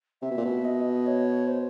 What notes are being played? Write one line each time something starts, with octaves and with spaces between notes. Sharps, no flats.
C3 E5
B2
A#2
B2
D#5
C#5
C5